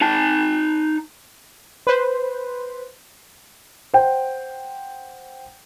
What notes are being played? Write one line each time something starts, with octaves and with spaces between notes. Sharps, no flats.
D#4 A5
B4 C5
C5 F#5 G5